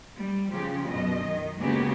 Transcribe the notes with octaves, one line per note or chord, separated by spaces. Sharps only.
G3
C#3 F3 G4
F#2 B2 D#5
D#3
C#3 G#3 A#3 B3 F#4 G4